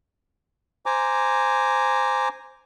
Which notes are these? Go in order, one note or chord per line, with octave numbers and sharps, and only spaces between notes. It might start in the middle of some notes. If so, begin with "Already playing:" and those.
C5 G#5 A#5 D6